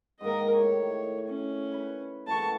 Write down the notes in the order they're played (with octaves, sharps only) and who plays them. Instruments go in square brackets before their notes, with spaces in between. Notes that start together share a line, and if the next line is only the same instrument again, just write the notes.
[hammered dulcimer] G#2 D#3 A#3 [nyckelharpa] A#4 D#5
[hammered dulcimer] A2 D#3 D6 [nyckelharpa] C#5
[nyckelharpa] C#4
[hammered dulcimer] B4 G#5 B5
[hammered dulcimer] A2 E3 F#4 [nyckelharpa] A5 C#6